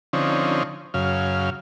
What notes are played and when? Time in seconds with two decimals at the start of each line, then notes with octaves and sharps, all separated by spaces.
0.13 D3 F3 C4 C#4 D#4
0.94 F#2 C#3 F5